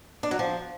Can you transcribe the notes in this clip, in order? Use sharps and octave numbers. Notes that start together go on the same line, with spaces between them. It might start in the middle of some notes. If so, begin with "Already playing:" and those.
D4
F#3
F3